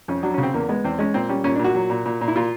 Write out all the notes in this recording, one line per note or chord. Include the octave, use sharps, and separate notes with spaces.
F2 C#4
F#3 D4
C#4
C#3
C4
E2 A#3
G#3 B3
E2 C4
G#3 C#4
A#2 C4
G3 C#4
A#2 C#4
D4
A#2 F#4
F#3
A#2
A#2
A#2
E4
A#2 F4